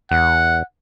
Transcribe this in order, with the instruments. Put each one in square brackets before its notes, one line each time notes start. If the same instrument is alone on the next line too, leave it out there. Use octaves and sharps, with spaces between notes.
[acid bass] E2 [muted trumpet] F#5